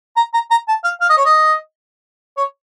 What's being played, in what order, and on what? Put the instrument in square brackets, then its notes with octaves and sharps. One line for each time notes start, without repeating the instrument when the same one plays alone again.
[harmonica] A#5
A#5
A#5
A5
F5
F5
D#5
C#5
D#5
C#5